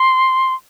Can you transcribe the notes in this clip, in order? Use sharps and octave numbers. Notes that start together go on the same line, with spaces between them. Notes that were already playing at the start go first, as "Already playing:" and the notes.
Already playing: C6